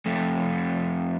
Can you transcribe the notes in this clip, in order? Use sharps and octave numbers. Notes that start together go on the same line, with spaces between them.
F2 A3